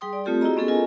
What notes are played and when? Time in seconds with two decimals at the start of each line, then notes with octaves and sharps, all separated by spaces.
0.01 G3 G#4 G5 C6 D#6
0.13 D5
0.25 A3 C4 F4 G4 A4
0.41 E4 F#4 G#4 D#5 A#5
0.56 G#3 B3 C#4 G#4 A4
0.68 F4 A4 A#4 D#5 G#5